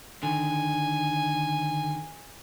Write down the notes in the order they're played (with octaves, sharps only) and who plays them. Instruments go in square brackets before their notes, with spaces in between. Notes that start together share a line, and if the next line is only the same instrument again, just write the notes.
[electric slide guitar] D3 D#3 [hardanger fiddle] G#5